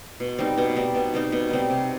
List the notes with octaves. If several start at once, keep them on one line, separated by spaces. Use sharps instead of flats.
B2
G3 C4 D#4
B2
G3 C4 D#4
B2
G3 C4 D#4
B2
G3 C4 D#4
C3